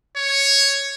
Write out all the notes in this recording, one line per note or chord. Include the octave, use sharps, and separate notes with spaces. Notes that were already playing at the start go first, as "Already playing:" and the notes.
C#5